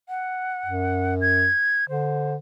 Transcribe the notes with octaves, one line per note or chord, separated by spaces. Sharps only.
F#5
F#2
G#6
D3 C5